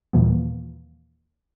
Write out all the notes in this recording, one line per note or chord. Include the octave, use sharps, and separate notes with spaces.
D#2 A#2 D#3 E3 G3 A#3